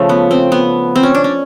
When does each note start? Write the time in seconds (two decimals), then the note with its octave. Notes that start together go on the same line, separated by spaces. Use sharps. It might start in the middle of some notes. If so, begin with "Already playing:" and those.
Already playing: C#3 F3 A3
0.09 B3
0.31 C4
0.52 B3
0.96 C4
1.03 C#4
1.15 D4
1.24 C#4